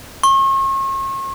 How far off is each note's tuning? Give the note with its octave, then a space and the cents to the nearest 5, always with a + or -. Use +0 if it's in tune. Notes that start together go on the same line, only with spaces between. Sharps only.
C#6 -40